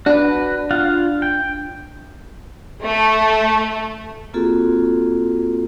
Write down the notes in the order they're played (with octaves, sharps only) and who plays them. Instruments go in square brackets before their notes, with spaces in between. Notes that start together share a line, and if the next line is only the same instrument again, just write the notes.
[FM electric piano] D4 [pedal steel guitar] F#4 B4
[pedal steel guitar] F4 F5 F#5
G5
[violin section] A3
[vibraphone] A#3 C4 F4 F#4 G#4 A4